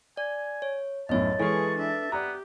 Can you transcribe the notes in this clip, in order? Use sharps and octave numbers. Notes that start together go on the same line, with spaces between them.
D5 G#5
C#5
B1 F#2 A2 C#5 D#5 A5
E3 G#3 G#4 A4 B4 C#6
D4 E5
B3 G4 D5 A#5